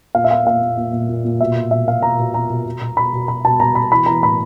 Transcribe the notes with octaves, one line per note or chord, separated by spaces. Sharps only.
A#2 F5
E5
A#2 F5
A#2 F5
A#2
A#2
A#2
A#2
A#2
B2 E5
B2
B2 E5
B2 F5
B2 A#5
B2
B2 A#5
B2
B2
B2
B2 B5
B2
B2 B5
B2 A5
B2 A#5
B2 B5
E3 B5
E3 A#5
A2 B5